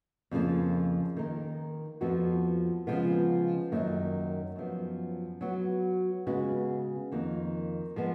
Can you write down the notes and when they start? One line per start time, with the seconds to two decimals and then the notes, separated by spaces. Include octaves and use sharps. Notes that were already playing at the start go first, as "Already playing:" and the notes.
0.31 F2 C#3 F3 A#3
1.17 D#3 A#3 D#4 A#4
2.01 F2 F3 B3 F#4
2.87 C#3 F3 G#3 B3 F4
3.72 F#2 D#3 A#3 C#4
4.56 F#2 F3 B3
5.41 F#3 B3 F#4
6.27 C#3 G#3 B3 F#4
7.12 F2 D#3 A#3
7.96 F3 G#3 B3